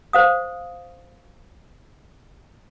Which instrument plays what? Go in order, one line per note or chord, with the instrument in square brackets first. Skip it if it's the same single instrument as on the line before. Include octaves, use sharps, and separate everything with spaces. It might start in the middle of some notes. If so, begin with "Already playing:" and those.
[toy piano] C5 F5 D#6